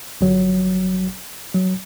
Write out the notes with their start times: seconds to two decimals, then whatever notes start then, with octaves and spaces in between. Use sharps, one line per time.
0.21 G1 F#3
1.55 F#3